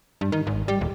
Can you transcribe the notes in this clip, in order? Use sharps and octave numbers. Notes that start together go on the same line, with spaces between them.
G2
D#3
G#1
G3
D#1